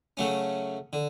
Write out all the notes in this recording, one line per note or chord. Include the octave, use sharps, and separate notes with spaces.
C#3 F#3 A3 C#4
D3